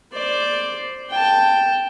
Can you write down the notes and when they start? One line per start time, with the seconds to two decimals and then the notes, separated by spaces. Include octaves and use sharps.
0.12 C5 D5
1.10 G5 A5